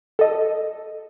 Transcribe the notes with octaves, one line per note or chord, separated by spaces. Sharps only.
A4 D#5